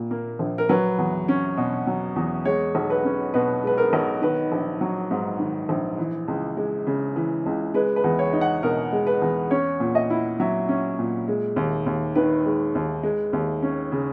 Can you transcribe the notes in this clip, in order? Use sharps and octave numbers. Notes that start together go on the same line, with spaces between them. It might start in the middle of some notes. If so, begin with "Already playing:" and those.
Already playing: A#2
A#3
A#1
A#4
F#3 B4
E2
C#4
B2
F#3
E2
G#3 C#5
B1
B4
C#4
B2 B4
G#3 B4
A#4
B1
D#3 B4
A#1
F#3
G#2
D#3
A#1
E3
C#2
G#3
C#3
E3
C#2
G#3 B4
B4
E2
C#5
D#4
F#5
B2 A#4
G#3
B4
E2
C#4 C#5
A#2
D#5
E4
F#3 E5
C#4
A#2
G#3
D#2
D#2
D#3 B4
G#3
D#2
G#3
D#2
C#4
C#3